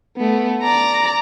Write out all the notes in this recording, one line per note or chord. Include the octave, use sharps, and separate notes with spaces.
A3 B3
D5 A#5